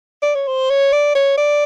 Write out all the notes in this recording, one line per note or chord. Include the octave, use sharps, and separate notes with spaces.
D5
C#5
C5
C#5
D5
C#5
D5